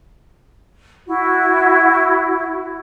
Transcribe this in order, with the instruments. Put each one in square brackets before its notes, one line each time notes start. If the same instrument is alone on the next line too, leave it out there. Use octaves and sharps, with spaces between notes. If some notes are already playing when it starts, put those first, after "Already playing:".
[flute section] E4 F#4